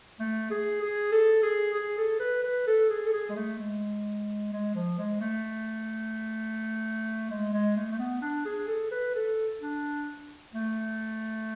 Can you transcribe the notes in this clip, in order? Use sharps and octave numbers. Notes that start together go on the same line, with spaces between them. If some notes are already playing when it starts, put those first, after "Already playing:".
A3
G#4
G#4
A4
G#4
G#4
A4
B4
B4
A4
G#4
A4
G#4
G#3
A3
G#3
G#3
F3
G#3
A3
G#3
G#3
A3
A3
B3
D4
G#4
A4
B4
A4
D4
A3